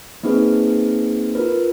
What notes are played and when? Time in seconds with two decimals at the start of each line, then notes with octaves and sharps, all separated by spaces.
0.23 A#3 C4 D#4 G#4 B4
1.35 F4 A#4 B4